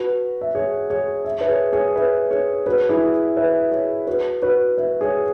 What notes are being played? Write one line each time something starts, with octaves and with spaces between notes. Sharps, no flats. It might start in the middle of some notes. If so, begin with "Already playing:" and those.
Already playing: F#4 B4
E5
G#4 C#5
G#4 C#5
E5
B4 E5
G#4 C#5
G#4 C#5
B4 E5
G#4 C#5
F#4 B4
E4 G#4
B4 E5
G#4 C#5
F#4 B4
F#4 B4
B4 E5
G#4 C#5